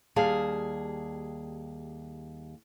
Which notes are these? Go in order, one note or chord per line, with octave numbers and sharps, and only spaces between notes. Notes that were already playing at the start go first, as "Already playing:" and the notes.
D#2 G3 G#4 F5 A5